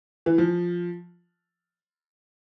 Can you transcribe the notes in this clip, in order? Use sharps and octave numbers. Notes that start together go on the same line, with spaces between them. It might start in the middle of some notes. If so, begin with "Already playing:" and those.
E3
F3